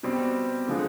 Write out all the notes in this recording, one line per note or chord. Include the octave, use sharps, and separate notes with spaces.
B2 G3 C4 G4
D3 F3 G#3